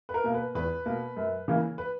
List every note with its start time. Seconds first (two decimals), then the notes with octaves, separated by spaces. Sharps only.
0.09 B4
0.14 A#4
0.24 B2 A#3
0.34 B4
0.55 E2 B4
0.86 B2 A#3
1.17 F#2
1.48 C#3 E3 A#3
1.78 B4